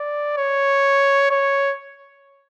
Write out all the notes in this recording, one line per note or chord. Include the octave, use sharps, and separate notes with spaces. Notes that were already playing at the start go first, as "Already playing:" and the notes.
Already playing: D5
C#5
C#5